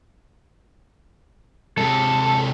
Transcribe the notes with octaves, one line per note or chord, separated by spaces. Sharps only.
C3 G#3 A4